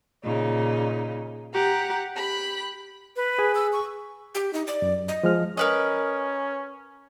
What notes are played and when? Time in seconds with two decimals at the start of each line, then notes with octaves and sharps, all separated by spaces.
0.25 A#2 C#3 D#4
1.54 G4 F#5 A#5
2.16 G4 B5 F#6
3.16 B4
3.39 G#4 G#5
3.55 E6
3.73 C#6
4.35 G4
4.53 D#4
4.67 D5
4.82 F#2
5.08 D#5
5.23 F3 G#3 F6
5.57 C#4 A#4 B4 D#5